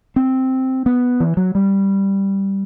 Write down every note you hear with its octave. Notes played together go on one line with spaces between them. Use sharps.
C4
B3
E3
F#3
G3